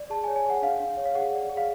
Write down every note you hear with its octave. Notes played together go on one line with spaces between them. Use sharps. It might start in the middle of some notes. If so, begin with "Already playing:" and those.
Already playing: D5
G#4 A5
G#5
C#5
G#5
G#4 F#5
D4 F5
D4
C#5
F5
G#4 F#5
D5
G#4
F5